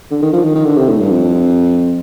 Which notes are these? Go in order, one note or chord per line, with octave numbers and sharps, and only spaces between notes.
D3
D#3
F3
D#3
D#3
D3
C3
A2
G2
F2